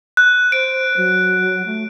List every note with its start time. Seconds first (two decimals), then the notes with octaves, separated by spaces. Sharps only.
0.17 F#6
0.52 C5 D7
0.97 F#3
1.66 A3